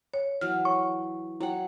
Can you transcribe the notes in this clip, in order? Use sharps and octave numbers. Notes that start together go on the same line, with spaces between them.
C#5
E3 F#3 F6
C#5 C#6
F#3 E4 F#5 G5